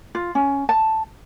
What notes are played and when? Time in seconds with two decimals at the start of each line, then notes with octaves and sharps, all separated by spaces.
0.15 F4
0.35 C#4
0.69 A5